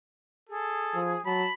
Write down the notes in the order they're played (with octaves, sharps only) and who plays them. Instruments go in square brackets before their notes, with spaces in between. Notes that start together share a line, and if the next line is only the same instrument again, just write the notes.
[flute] G#4 [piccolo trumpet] A4
[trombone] F3
[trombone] F#3 [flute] A5 [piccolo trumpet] B5